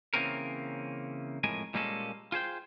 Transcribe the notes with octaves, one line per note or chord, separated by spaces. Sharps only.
C#3 E3 A#3 C4 C#4 A#4
F2 A2 G#3 A#4 G#5
A#2 G3 G#3 A#3 C#4 A4
F4 G#4 C5 G5